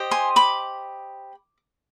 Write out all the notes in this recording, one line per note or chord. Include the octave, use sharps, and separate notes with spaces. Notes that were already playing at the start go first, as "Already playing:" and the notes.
Already playing: G4 C5 D#5
G#5 C6
B5 D6